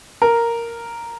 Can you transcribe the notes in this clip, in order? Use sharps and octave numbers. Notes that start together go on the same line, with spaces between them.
A#4